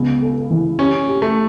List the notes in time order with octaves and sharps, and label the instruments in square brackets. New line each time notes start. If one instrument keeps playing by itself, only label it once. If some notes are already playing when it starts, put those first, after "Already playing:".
Already playing: [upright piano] C#2 C#3 B3
A4
E3
[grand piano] C#4 [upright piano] G4
[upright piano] G4
[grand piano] A3